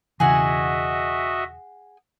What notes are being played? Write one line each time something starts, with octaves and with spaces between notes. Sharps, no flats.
E1 C#3 E3 F#4 G#4 D#5 E5 F#5